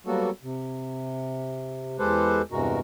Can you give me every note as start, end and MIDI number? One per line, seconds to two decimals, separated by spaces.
0.06 0.30 54
0.06 0.30 55
0.06 0.30 58
0.06 0.30 59
0.06 0.30 66
0.06 0.30 69
0.43 1.97 48
1.99 2.42 40
1.99 2.42 56
1.99 2.42 67
1.99 2.42 69
1.99 2.42 71
1.99 2.42 72
2.52 2.80 40
2.52 2.80 43
2.52 2.80 48
2.52 2.80 56
2.52 2.80 66
2.52 2.80 70